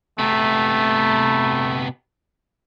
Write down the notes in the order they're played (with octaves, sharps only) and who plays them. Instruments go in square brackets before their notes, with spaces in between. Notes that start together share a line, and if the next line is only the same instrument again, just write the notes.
[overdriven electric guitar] C3 B3 [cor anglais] A3